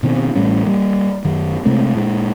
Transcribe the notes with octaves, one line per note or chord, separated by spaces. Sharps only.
B2 D#3 C4
A1 A2 G3 C#4
G3 A#3
F#2 D#3
C3 G#3 A3 C4
A#2 G#3